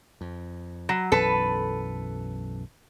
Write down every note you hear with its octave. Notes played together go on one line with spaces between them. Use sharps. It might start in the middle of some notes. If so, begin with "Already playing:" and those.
F2
F#3
B1 F#2 E3 A4 B4